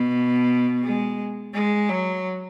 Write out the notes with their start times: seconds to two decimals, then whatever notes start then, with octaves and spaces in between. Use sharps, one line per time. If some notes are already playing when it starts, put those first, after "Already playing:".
Already playing: B2
0.84 G#3
1.54 G#3
1.90 F#3